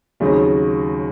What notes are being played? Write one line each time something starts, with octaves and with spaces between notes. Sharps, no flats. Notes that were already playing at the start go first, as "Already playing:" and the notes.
D#2 C#3 F#3 C4 D#4